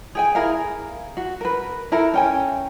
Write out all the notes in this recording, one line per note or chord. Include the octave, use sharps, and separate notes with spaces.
G#4 G5 G#5
E4 G#4 A#4 F5
F#4
A#4 B4
E4 A4 A#4
C#4 G5 G#5